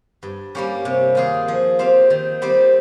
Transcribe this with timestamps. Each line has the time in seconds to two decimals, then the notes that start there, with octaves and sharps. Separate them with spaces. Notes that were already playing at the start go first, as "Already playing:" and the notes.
0.23 G2
0.55 G3 A#3 C#4 G4
0.85 C3
1.15 D#3 A#3 F4 G#4
1.48 F3
1.79 C4 G4 C5 F5
2.10 D#3
2.42 G3 C4 G4 C5